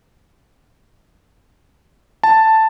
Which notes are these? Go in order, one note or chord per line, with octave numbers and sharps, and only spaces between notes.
A5